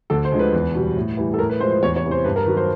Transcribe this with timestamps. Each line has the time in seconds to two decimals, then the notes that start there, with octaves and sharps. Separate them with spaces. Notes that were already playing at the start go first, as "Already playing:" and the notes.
0.10 D2 A4
0.25 C5
0.32 D3 F3 G#3
0.39 B4
0.53 E2
0.75 B2 G3
0.97 A2
1.17 E3 G3
1.34 A4
1.39 A2 A#4
1.50 B4
1.60 F3 G#3 C5
1.71 C5
1.82 E2 C#5
1.96 C#5
2.04 C3 E3
2.11 C5
2.24 G2 B4
2.36 A#4
2.46 D#3 F#3 B4
2.57 C5